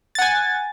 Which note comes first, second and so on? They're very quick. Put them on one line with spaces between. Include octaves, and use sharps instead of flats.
A6 F#5 G#5